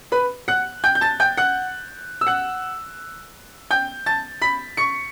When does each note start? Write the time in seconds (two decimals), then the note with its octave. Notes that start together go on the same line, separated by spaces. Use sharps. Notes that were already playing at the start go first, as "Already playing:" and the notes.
0.12 B4 B5
0.48 F#5 F#6
0.84 G5 G6
0.95 G6
1.01 A5 A6
1.20 G5 G6
1.37 F#5 F#6
2.21 E6
2.27 F#5 F#6
3.70 G5 G6
4.06 A5 A6
4.42 B5 B6
4.77 C#6 C#7